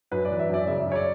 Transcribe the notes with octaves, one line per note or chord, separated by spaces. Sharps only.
F#2 B4
D5
E3
E5
F#2 D5
C#3 E5
F#2
C#5
D5